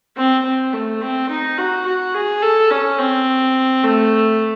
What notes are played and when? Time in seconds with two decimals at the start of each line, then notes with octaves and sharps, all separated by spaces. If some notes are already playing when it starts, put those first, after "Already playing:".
0.17 C4
0.46 C4
0.74 A3
1.02 C4
1.30 D#4
1.58 F#4
1.86 F#4
2.14 G#4
2.42 A4
2.71 C#4
2.99 C4
3.83 A3